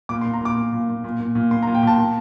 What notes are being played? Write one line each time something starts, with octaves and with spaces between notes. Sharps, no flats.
A#2 D6
C6
A#2
A#5
A#2 D6
A#2
A#2
A#2
A#2
A#2
A#2
A#2 C6
A#5
A#2
G5
A#2 A5
A#2